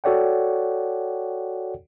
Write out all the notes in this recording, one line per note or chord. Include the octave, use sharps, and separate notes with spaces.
F#4 A4 C#5 D5 F#5 G5